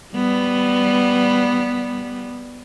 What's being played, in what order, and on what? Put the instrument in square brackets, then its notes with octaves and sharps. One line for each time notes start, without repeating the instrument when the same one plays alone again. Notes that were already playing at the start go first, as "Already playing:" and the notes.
[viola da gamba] G3 B3